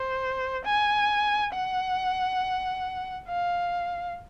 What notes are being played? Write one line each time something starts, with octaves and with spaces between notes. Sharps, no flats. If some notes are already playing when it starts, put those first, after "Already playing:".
Already playing: C5
G#5
F#5
F5